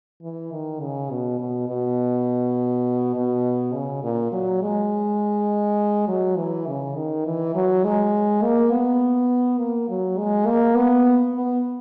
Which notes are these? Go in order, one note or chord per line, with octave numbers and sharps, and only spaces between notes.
E3
D#3
C#3
B2
B2
B2
B2
C#3
A#2
F#3
G#3
F#3
E3
C#3
D#3
E3
F#3
G#3
A#3
B3
A#3
F#3
G#3
A#3
B3
B3